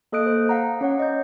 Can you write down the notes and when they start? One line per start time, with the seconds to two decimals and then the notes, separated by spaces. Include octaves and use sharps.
0.12 A#3 A4 D#5 D#6 F#6 D7
0.26 C5
0.49 F5 F#5 A#5
0.81 C#4 C#5 F#5
0.99 D#5 G6